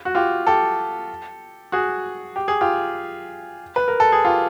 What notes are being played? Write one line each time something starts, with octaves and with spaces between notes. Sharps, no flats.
F#4
F4 G4
G4 A4
F#4 G#4
G4
G#4
F4 G4
B4
A#4
A4
G#4
F4 G4